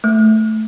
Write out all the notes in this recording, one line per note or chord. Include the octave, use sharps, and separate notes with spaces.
A3